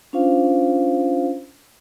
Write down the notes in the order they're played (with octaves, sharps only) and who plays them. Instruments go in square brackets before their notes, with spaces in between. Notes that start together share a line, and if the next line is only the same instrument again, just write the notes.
[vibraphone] C#4 D4 F4 C5 F5